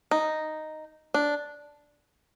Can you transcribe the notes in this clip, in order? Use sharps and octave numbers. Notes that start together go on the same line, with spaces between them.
D#4
D4